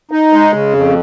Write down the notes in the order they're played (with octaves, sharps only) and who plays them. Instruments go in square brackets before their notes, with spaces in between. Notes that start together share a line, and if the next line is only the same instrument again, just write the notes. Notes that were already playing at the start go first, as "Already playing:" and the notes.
[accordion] D#4
G#3
C#3
F2